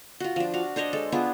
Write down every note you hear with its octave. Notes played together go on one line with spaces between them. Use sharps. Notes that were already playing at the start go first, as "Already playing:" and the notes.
F4 F#4
F3 D4
F#4 F5
D4 C5 C#5 D#5
G#3 A4
B3 D4 F4 G#4